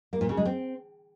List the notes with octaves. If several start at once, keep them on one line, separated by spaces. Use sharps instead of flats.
A#3
A#2
C#3
G#3
C4